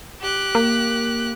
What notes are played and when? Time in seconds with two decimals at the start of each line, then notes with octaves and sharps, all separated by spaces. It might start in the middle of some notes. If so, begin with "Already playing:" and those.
0.21 G4 F#6
0.55 A#3